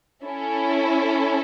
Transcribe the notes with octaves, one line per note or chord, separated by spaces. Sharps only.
C#4 E4 A4